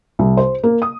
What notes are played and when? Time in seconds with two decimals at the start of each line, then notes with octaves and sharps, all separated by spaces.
0.19 C2
0.37 C5
0.63 A#3
0.82 D#6